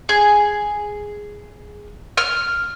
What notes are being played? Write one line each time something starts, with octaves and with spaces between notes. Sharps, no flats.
G#4
F6